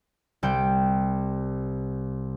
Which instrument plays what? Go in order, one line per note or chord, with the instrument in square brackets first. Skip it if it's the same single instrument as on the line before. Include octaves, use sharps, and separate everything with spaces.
[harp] C2 G5